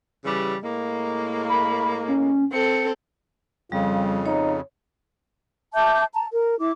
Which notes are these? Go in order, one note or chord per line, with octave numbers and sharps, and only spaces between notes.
C#3 E3 G3
A2 G#3 A#3
B5
C#4
C4 A4 C#7
F2 C#3 G3 F4
D#4 C#5
E5 A5 D6 G6
A5 A#5
A#4
E4 D6